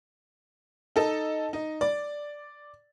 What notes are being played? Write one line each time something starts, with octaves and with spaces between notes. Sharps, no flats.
D#4 A4
D#4
D5